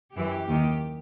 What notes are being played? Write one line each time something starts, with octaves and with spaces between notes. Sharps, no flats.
F#2 E3 G4
D#2 D#3